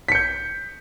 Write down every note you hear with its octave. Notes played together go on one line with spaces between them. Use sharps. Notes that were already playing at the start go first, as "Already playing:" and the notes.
G6 B6 C#7